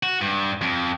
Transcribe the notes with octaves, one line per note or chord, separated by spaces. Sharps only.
F#4
G2
F2